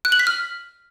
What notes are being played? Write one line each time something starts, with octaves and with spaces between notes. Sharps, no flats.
F#6
F#7
B6
F6